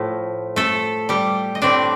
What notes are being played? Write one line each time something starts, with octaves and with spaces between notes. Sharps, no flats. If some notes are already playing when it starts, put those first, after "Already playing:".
Already playing: A2 F3 A3
A3 A4
G3 G4
D#5
A2 A3 C4 D4 D5